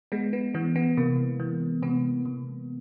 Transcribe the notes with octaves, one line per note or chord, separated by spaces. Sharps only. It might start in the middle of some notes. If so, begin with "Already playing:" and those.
G#3 B3
B3
E3 B3
B3
C3 A#3
E3
C3 B3
C3